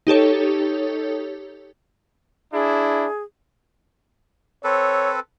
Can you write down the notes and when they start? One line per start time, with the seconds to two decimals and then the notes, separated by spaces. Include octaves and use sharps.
0.07 D#4 G4 A4 C#5
2.53 D4 E4 G#4
4.64 C4 A4 B4 C#5